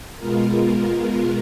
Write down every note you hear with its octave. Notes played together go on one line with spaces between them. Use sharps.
B2 G#3 B3 F4 A#4